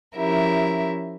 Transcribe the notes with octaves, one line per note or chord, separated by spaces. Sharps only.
F3 C#4 E4 G4 A#4 E5